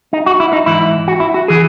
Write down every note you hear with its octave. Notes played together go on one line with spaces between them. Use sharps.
D#4
F#4
E4
D#4
G#2 E3 E4
F#4
E4
F#4
E3 G#4